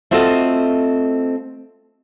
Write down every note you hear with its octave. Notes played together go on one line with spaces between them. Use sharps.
A3 C4 F4 F#4 A4 D#5